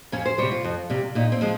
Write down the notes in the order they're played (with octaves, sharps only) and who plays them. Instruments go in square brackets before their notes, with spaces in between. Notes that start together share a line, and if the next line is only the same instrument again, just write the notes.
[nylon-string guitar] F2 C#4
C5
C3 G3 C#5
F4
F2
C3 G3
A#2 D#4
C4
F3 G#3